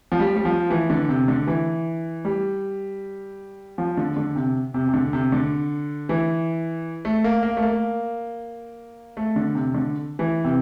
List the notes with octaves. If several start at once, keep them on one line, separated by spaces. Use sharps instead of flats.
F3
G3
G3
F3
E3
D3
C3
D3
E3
G3
F3
D3
D3
C3
C3
C3
D3
C3
D3
E3
A3
A#3
A#3
A3
A#3
A3
D3
C3
D3
E3
C3